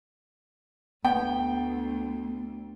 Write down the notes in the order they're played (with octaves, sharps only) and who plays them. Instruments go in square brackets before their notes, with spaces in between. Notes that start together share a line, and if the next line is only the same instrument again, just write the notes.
[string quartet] D2 [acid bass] B3 [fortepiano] G5